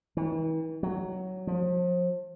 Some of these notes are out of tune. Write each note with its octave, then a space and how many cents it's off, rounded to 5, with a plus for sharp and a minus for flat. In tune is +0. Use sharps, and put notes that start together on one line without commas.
E3 -45
F#3 +5
F3 +35